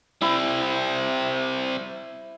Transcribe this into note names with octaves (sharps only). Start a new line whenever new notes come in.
G3 C4 E4